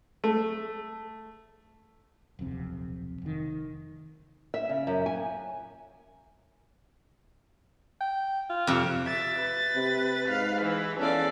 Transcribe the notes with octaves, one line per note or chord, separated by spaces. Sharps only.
A3
D#1 B1 F2 C3
F1 D#3
E5
C#3
F#2
G#5
G5
F4
F2 C3
E5 A6
B4
C3
G#2 F5
E3
E2 C#4 A4 D5 F5